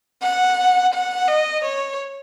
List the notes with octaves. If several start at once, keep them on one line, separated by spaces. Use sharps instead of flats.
F#5
F#5
D#5
C#5